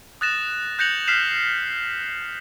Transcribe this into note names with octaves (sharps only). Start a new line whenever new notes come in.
D#6 F#6 A6 A#6 E7
F#6 G6 A#6 C#7 F7 F#7
F6 B6 C7 E7 F7